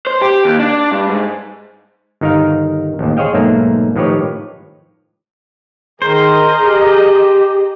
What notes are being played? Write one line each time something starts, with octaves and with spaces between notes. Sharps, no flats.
C5
G4
D#2
D4
G2
G#2
G1 D#3 D#4 A#4 F5
A1 D#2
G#4 C5 C#5 D#5 F5 G5
B1 G#2 A3 A#3
A2 D#3 F3 G4 B4 C#5
D#3 G#4 A#4 C5 D#5 A#5
G4